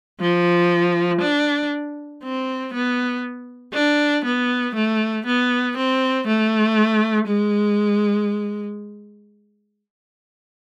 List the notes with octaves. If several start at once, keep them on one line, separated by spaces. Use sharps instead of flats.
F3
D4
C4
B3
D4
B3
A3
B3
C4
A3
G#3